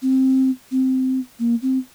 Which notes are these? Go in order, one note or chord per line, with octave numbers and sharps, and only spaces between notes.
C4
C4
A#3
C4